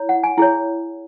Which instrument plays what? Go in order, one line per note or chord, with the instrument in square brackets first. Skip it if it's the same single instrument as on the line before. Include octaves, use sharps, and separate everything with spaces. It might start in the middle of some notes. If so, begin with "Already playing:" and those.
Already playing: [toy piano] E4 C#5
F#5
G#5
E4 G#4 C#5